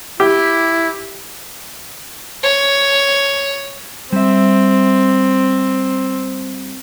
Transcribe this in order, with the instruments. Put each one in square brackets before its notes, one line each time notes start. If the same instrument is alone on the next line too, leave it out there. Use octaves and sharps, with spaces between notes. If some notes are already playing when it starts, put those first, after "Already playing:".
[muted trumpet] E4 [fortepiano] G4
[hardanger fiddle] C#5
[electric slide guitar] G3 E5 [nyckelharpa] C4